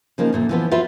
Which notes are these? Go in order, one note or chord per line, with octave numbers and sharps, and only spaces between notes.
C#3 F3 A#3 D#4
D2 A#2 A3
E3 F3 B3
F4 F#4 B4 C5 E5